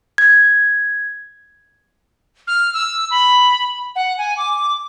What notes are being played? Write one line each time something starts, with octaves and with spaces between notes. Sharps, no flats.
G#6
F6
E6
B5
F#5
G#5
D6